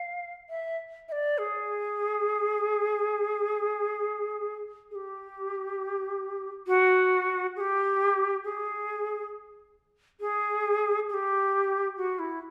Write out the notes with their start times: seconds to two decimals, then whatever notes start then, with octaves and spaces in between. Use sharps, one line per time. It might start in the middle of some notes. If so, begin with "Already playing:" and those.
Already playing: F5
0.50 E5
1.08 E5
1.12 D5
1.38 G#4
4.91 G#4
4.95 G4
6.67 F#4
7.56 G#4
7.60 G4
8.44 G#4
10.20 G#4
11.09 G#4
11.14 G4
11.97 F#4
12.19 E4